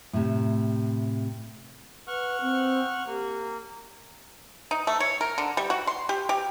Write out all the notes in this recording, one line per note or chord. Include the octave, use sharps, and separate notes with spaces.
A2 C3
B4 F#5 C#6 F6
C4
A#3 G4
D#4
A3
C#5
A#4
D3
G3
F#4
C6
G4
G4